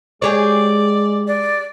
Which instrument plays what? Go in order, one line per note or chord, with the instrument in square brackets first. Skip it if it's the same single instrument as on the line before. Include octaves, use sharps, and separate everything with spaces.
[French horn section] G#3 [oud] G4 G#4 C#5 [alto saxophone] D5
[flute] D5